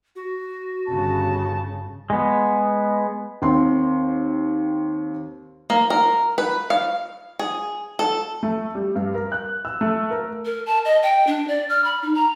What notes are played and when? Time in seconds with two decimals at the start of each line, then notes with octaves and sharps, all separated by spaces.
0.16 F#4
0.89 G1 C#3 A5
2.10 G#3 B3
3.42 D#2 C4 C6
5.70 A#3
5.90 A#4
6.38 B4
6.70 F5
7.39 G#4
7.99 A4
8.43 A3
8.75 G3
8.96 G2
9.14 A#4
9.32 F#6
9.65 E6
9.81 A3
10.11 A#4
10.45 A#4
10.66 A5
10.85 D#5
11.03 G5
11.27 D4
11.48 D5
11.69 F6
11.84 B5
12.02 D#4
12.14 A#5